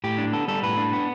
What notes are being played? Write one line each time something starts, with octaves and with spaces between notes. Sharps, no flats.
A2 G4
D4
B3 A4
G3 A4
A2 B4
D4
B3